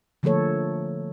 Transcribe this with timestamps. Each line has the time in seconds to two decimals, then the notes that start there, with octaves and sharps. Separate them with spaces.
0.23 D3 F3 A3 A#3 A4 C#5